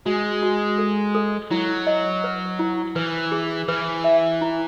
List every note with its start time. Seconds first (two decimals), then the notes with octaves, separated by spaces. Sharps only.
0.06 G#3 F#4
0.43 F#4
0.78 A4
1.15 A4
1.51 F#3 E4
1.87 D#5
2.24 B4
2.59 E4
2.96 E3 B4
3.32 G#4
3.68 E3 B4
4.04 E5
4.41 E4